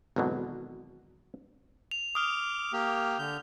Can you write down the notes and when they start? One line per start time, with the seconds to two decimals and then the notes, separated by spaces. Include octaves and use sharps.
0.16 G#1 E2 B2 D3 F#3
1.91 F7
2.15 D6 D#6 F6
2.73 A#3 G4
3.19 D3 G6